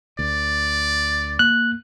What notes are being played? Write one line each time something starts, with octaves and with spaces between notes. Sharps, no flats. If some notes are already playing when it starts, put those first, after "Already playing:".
D2 D5
A#3 F#6